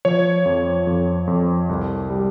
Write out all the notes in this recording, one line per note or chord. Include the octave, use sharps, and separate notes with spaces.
F3 C#5
F2
F2
F2
C2
G3